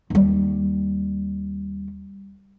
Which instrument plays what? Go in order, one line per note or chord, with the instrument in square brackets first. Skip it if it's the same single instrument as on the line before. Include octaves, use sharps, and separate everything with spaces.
[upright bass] D#2 G3